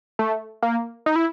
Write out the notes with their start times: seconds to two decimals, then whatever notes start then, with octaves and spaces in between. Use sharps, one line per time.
0.19 A3
0.63 A#3
1.06 D#4
1.16 E4